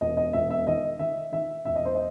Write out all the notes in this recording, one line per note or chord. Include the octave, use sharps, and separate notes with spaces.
E1 D#5
D#5
E1 E5
E5
D#3 D#5
D#3 E5
D#3 E5
E1 E5
D#5
C5
D#5